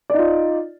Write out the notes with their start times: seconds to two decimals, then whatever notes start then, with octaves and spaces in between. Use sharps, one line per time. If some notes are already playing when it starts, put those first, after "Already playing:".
0.10 D5
0.14 D#4
0.18 F4